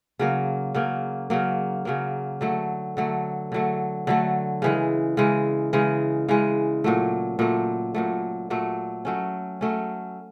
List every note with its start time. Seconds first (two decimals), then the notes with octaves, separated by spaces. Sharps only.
0.19 C#3 F#3 A#3
0.75 C#3 F#3 A#3
1.30 C#3 F#3 A#3
1.85 C#3 F#3 A#3
2.41 D3 F#3 A3
2.97 D3 F#3 A3
3.52 D3 F#3 A3
4.07 D3 F#3 A3
4.62 C#3 E3 G#3
5.17 C#3 E3 G#3
5.73 C#3 E3 G#3
6.28 C#3 E3 G#3
6.84 A#2 F#3 A3
7.39 A#2 F#3 A3
7.95 A#2 F#3 A3
8.50 A#2 F#3 A3
9.05 F#3 A3 C#4
9.61 F#3 A3 C#4